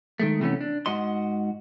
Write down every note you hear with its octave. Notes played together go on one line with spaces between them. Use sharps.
D#3 G#3 A3
C3 E3 A3 B3 C#4
D4
G#2 F#4 D#5 C6